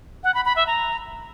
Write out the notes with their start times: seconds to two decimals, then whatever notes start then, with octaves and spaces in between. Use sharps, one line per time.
0.24 F#5
0.34 B5
0.45 B5
0.56 E5
0.67 A#5